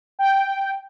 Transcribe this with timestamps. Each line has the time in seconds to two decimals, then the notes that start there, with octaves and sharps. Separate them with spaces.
0.19 G5